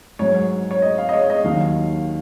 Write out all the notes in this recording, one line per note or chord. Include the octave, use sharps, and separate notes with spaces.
G#2 F#3 C#5
C#5
D#5
F5
D#5
C#5
D#5
D#2 D#3 F#3 F5